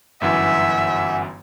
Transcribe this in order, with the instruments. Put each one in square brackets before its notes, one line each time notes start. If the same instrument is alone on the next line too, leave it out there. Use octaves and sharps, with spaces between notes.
[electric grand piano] G1 F#2 E3 [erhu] E5 [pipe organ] F#5 G#5